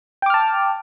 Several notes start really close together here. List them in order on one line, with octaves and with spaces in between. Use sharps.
G5 D6 F6 A5